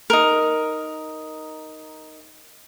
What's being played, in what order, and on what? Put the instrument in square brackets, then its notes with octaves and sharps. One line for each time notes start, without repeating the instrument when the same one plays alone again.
[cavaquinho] D#4 A#4